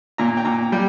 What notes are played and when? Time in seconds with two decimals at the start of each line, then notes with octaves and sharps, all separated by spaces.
0.18 A#2 A#5
0.37 G5
0.45 A#2 A#5
0.72 G3 G5